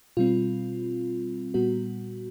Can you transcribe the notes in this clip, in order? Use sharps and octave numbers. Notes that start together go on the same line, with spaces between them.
B2 G3 C4 F4
A#2 G3 B3 F#4